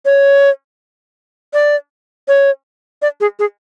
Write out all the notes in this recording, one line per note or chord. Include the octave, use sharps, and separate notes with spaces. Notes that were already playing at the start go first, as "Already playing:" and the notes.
C#5
D5
C#5
D5
G#4
G#4